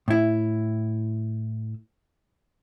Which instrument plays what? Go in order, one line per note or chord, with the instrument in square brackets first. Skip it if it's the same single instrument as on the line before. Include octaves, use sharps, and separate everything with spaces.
[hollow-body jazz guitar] A2 E4